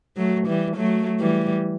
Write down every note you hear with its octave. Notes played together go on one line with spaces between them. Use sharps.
F#3 A3
E3 G3
F#3 A3
E3 G3